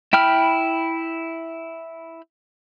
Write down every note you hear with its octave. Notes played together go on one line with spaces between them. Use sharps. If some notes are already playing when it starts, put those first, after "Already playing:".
E4 G5 B5 F6